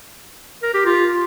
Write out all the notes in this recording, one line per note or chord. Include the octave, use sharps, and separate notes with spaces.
A#4
G4
F4